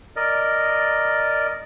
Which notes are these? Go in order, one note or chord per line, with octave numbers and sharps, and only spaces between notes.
A#4 D5 D#5